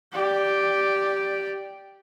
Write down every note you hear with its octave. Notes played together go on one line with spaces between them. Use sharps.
G4 D5